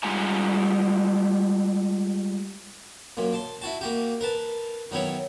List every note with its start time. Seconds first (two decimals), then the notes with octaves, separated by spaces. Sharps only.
0.03 G3 G#3 F4 F#5 G#5 A#5
3.17 F#2 A#2
3.33 A5 C6
3.61 E4 F#4 A5
3.81 A#3 F#4 G4
4.21 A#4 B4 A5
4.91 D#3 F#3 B3 E4 C#5